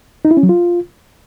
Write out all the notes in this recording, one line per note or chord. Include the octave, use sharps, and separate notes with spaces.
D#4
E4
C#4
F#3
F4